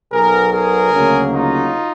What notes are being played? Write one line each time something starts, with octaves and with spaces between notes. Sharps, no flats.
B1 B2 F#3 B3 G#4 A#4
G#4 A#4
D2 C#3 F#3 A#3
D#4 F4